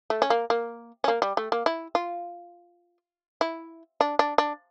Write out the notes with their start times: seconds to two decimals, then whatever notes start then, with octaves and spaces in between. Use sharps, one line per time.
0.10 A3
0.22 C#4
0.30 A#3
0.50 A#3
1.04 C#4
1.08 A#3
1.22 G3
1.37 A3
1.52 A#3
1.66 E4
1.95 F4
3.41 E4
4.01 D4
4.19 D4
4.38 D4